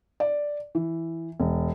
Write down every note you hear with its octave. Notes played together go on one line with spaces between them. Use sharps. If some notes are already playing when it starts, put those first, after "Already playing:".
D5
E3
E1